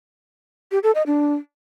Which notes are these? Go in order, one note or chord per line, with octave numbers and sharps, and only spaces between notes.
G4
A4
D#5
D4